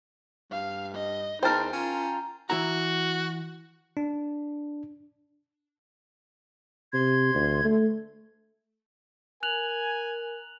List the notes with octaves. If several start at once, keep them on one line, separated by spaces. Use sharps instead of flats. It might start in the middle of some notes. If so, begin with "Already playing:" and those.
G2 F5
D#5
E2 D#4 A#4 C5 G5 A5 A#5
C#4 F4
E3 E4 F#4 A#5
D4
C3 C6 G#6
D2
A3
A#4 G#5 F#6 F7 F#7